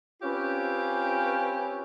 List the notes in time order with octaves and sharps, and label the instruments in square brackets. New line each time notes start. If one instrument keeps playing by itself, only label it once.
[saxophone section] C4 C#4 F4 G4 B4 C#5